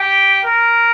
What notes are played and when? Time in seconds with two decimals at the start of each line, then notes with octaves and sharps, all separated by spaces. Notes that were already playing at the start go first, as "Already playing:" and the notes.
Already playing: G4
0.45 A#4